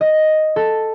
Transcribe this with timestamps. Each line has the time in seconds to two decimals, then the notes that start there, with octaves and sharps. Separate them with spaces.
0.01 D#5
0.56 A4